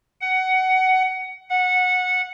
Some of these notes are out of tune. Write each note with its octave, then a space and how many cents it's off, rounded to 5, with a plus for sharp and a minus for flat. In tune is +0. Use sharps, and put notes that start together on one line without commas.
F#5 +20
F#5 -15